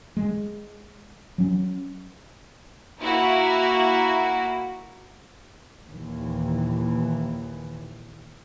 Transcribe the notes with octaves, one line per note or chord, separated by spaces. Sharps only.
G#3
F#3 C#4
A#3 E4 F#4
D#2 A#2 E3